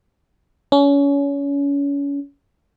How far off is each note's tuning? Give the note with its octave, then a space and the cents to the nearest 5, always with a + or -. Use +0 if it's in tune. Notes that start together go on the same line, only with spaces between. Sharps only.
C#4 +30